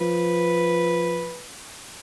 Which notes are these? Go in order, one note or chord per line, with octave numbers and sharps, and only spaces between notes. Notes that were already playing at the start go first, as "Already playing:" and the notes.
F3 B4